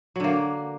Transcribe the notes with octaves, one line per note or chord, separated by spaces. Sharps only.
D3 F#3 A#3